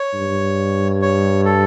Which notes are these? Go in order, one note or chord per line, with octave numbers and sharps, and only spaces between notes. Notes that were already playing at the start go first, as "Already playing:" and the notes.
Already playing: C#5
G2
C#5
A4